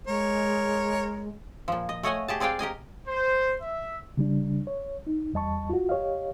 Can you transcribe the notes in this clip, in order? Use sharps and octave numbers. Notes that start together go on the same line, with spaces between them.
G#3 A#4 C#5
A#2 F3
D#5
A3 C#5 D#5 F#5 G#5
G4 G#4 A5
C4 G#4 D5 F5 G5
G4 A#4 D#5 G#5
C5
E5
C#3 G3 D4
C#5
D#4
E2 G3 D#5 A5 C#6
F4 F#4
G4 C#5 D#5 F5